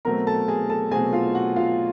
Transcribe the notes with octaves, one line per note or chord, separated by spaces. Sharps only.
B2 F#3 A3 C4 A#4 A#5
A4 A5
G#4 G#5
A4 A5
B2 F#3 A3 C4 G#4 G#5
F4 F5
F#4 F#5
F4 F5